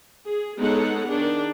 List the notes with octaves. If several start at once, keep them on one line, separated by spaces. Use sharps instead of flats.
G#4
G#3 B3 D#4 A4 C#5 F#5
D#3 D4 G#4